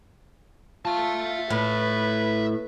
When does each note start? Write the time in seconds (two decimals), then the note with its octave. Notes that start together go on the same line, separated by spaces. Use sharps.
0.85 F4 E5 A5
1.50 A2 B4